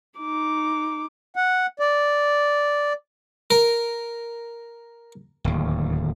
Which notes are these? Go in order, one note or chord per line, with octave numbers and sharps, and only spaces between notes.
D#4 D6
F#5
D5
A#4
D1 D#2